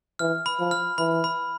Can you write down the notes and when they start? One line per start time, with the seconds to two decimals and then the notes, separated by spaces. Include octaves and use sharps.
0.19 E3 F6
0.46 B5
0.59 F3
0.71 F6
0.98 E3 B5
1.24 B5